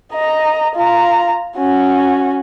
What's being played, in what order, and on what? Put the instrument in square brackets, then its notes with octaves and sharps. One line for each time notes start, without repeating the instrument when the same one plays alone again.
[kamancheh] D#5 A#5
F4 A#5
C#4 F#4